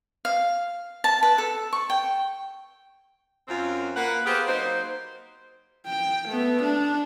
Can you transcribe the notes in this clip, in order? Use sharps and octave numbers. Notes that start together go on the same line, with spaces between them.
F5
A5
B4
A4
C#6
G5
F#2 C4 F4
A#3 B4 F#5
B3 G4 G#4 B4 C5 F5
F#3 A#3 D#4 C5
G5
A3 B3
D4